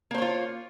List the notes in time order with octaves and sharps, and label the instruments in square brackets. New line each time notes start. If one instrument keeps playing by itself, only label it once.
[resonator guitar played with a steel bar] A#3
C5
C#5
F4